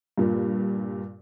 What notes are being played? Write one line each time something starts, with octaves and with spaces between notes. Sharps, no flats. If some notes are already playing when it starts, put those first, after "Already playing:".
G2 A#2